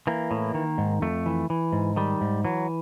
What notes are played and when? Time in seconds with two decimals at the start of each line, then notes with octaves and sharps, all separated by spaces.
0.07 E3 A#3
0.31 A2
0.55 D#3
0.78 G#2
1.02 F2 A3
1.26 E3
1.50 E3
1.73 G#2
1.96 D#3 G3
2.21 G#2
2.44 E3 F#3